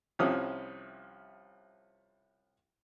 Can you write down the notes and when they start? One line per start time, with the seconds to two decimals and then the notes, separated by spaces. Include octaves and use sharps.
0.19 C2 C3 F3 C#4 D#6